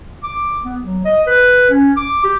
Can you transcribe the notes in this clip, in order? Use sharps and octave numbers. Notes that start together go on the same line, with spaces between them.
D6
B3
F#3
D#5
B4
C#4
D6
G4